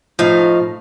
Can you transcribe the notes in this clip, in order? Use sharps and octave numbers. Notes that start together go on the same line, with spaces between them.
A2 F3 D#4 F5